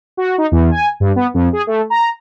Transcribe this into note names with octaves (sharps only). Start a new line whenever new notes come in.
F#4
D#4
E2
G#5
G2
B3
F2
G#4
A3
A#5